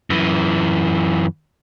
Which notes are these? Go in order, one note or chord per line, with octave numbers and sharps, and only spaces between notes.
F#2 E3